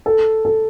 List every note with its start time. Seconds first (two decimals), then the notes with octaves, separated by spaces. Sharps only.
0.06 A4
0.45 A4